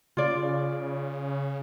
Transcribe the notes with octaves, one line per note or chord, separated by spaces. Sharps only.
C#3 F4 D5